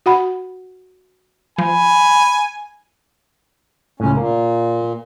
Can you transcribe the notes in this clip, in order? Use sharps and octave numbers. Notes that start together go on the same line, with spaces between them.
F#4 F#5 B5
F3 G#5 B5
C#2 A2 C#4
A#2 A#3